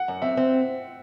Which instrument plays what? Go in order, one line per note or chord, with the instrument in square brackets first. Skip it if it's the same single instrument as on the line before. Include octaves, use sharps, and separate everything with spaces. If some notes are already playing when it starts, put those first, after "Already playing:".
Already playing: [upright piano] F#5
[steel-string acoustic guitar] F#2
[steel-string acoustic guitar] C4 [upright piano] E5
[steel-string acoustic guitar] C4